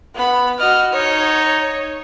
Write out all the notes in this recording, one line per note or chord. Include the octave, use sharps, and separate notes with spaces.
B3 B5
F#4 D#5 F6
D#4 C#5